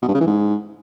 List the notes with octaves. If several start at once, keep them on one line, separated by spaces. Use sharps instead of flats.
B2
G2
C#3
E3
G#2